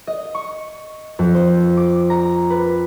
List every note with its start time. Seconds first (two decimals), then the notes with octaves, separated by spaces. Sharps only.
0.07 D#5
0.35 C#6
1.19 F2
1.35 C5
1.77 D6
2.10 A#5
2.50 B4